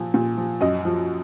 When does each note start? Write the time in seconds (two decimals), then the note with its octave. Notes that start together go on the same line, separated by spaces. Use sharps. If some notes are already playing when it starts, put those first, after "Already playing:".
Already playing: A#2 F3
0.14 A#2
0.37 F3
0.61 F#2 D#5
0.85 F3